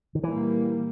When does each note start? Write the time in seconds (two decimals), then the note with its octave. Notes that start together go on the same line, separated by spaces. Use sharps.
0.15 D#3
0.23 A#2 E3 G3 A#3